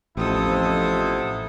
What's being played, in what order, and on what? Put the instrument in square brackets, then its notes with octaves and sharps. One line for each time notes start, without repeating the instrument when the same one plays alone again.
[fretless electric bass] A1 [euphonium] F2 [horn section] C3 B3 E4 [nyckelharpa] A4 D#6